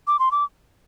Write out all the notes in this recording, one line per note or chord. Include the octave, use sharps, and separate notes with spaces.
D6
C6
D6